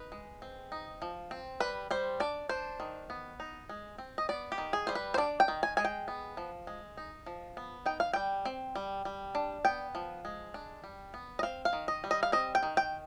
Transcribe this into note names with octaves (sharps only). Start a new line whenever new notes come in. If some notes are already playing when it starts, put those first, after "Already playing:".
Already playing: D#4 B4
G#3
C4
D#4
F3
C4
G3 B4
G3 C5
D4 D5
D4 C5
D#3
B3
D#4
G#3
C4
D#5
B3 D5
G4
D#3
G#4
G3 C5
B4
C5
D4 D5
G5
D#3
G#5
G#3 G#5
G5
B3
F3
G#3
D#4
F3
B3
D#4 G5
F5
G3 G5
C4
G3
G3
D4
B3 G5
F3
G#3
D4
G3
B3
D#5
C4 F5
F5
D#3
D#5
G3
D#5
F5
C4 D#5
G5
D#3
G5